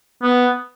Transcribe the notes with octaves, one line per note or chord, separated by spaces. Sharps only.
B3